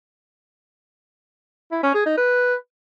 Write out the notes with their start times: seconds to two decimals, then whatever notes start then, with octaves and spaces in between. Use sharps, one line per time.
1.72 E4
1.83 C#4
1.94 G#4
2.06 D#4
2.17 B4